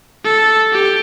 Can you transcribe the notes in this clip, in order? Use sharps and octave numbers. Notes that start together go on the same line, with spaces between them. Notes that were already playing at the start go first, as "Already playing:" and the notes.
A4
G4